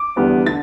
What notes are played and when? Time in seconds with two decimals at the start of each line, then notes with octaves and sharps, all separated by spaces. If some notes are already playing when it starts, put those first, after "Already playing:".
Already playing: D6
0.16 E2 D3 G3 B3
0.46 D3 A6